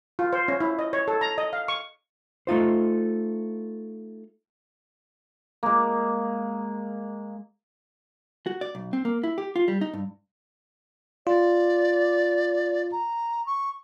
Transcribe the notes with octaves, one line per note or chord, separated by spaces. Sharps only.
F4
C5
C#4
E4
D#5
C#5
A4
A#5
D#5
F5
C#6
A3 D#4 F4 C5
G#3 A#3
F#4
D5
B1
C4
A#3
E4
G4
F4
G3
D#4
G2
F4 D5
A#5
C#6